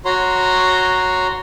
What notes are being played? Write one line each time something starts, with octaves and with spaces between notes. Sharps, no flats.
F#4 C#5 A#5 C6